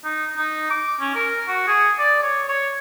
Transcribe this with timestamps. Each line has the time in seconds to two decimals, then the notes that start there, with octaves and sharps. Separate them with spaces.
0.04 D#4
0.38 D#4
0.70 D6
1.00 C#4
1.15 A#4
1.48 F#4
1.68 G#4
1.99 D5
2.23 C#5
2.49 C#5